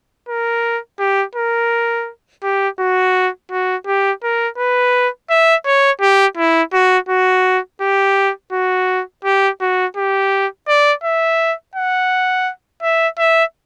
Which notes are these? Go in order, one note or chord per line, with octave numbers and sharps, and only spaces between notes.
A#4
G4
A#4
G4
F#4
F#4
G4
A#4
B4
E5
C#5
G4
E4
F#4
F#4
G4
F#4
G4
F#4
G4
D5
E5
F#5
E5
E5